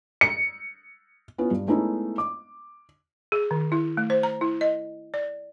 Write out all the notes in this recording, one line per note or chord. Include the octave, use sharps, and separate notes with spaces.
C#7
B3 C#4 E4 F4
G2
G#3 A3 B3 C#4 D#4 E4
D6
G#4
D#3
E4
A3
C5
A#5
E4
D#5
D5